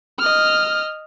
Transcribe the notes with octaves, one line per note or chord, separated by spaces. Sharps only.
D#5 F6